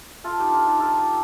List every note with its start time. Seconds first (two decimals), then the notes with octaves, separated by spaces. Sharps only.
0.24 F4 A4
0.38 D#4 G4
0.52 D4 F4
0.66 D#4 G4
0.80 F4 A4